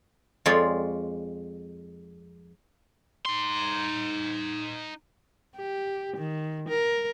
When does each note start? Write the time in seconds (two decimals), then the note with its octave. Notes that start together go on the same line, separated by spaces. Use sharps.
0.46 F2 G#3 F4 C#5 D5 G5
3.26 D#4 C6
5.57 G4
6.17 D#3
6.69 A#4